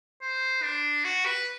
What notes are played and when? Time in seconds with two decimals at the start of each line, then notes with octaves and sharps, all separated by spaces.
0.22 C5
0.63 D4
1.04 F#4
1.26 B4